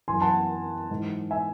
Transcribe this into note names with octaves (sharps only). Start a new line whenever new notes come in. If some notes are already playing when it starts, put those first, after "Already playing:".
F#2 E3 G#5 C6
F#5 A5
G#2 E3
E5 G#5